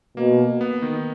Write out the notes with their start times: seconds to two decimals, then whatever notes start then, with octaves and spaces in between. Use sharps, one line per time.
0.17 B2 A#3
0.61 B3
0.82 D#3